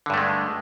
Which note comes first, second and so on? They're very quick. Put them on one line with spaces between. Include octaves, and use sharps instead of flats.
D3 G2 A3 G#3